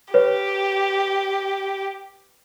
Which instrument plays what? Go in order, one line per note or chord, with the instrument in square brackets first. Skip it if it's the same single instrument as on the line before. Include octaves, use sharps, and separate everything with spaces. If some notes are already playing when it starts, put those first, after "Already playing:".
[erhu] G4 [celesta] B4 C#5